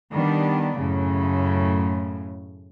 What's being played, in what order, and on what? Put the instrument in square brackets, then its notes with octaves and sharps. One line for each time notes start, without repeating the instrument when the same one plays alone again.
[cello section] D#3 G3 B3 D4
F#2 A2 C#3